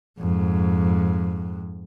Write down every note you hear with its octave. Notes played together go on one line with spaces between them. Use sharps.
F2 G#2